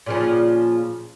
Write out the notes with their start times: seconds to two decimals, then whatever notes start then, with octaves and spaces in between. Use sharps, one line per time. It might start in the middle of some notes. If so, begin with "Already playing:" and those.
0.06 A#2 C#3 F3